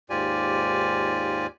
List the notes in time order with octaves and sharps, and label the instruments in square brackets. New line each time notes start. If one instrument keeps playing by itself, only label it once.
[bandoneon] D#2 G#2 F4 G4 D5 G#5